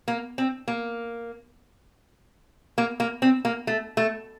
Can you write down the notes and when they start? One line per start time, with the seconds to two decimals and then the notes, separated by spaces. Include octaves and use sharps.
0.08 A#3
0.38 C4
0.68 A#3
2.78 A#3
3.00 A#3
3.22 C4
3.45 A#3
3.67 A3
3.97 A3